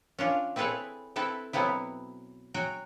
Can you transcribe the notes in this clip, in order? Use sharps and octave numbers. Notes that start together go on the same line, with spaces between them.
C#4 D4 F4
C4 E4 G#4 A4 B4 C#5
C4 E4 A4 B4
B2 F#3 B3 C4 E4
F#3 F#4 G5 G#5